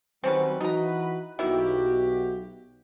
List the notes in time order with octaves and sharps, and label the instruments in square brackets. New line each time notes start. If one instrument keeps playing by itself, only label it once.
[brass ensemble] D#3 F#3 G3 [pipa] C4 C#4 B4
[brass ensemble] E3 F#4 B4 [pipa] D#4 A#5
[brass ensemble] B1 F#4 G4 [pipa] D#3 A#3 E4